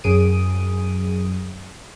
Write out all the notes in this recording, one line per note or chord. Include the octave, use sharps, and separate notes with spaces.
F#2 G#4 D#6 D7 D#7